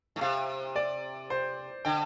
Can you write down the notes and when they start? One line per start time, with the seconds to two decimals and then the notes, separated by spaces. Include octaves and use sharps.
0.16 A2
0.21 C3 F5
0.76 D5
1.30 C5
1.85 D3 G5